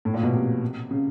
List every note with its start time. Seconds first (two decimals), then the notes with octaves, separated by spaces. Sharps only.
0.05 A2
0.14 A#2
0.23 B2
0.33 C3
0.91 C#3